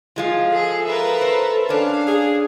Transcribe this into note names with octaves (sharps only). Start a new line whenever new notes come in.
F3 G#3 F4
G#4 A4
A#4 B4 E5
C5
C#4 D4 F5
G#4